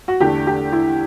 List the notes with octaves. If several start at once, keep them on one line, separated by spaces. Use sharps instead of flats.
F#4
E2 D3 A3 G4
G4
E4